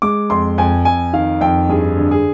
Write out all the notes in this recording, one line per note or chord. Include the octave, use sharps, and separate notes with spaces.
G#3 D6
F2 C6
F2 G#5
F2 G#5
D#3 F5
F2 G5
G2 G#4
D3
G#4